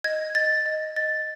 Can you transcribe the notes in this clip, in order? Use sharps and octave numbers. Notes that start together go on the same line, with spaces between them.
D#5 G#6
D#5 A6
D#5
D#5 A6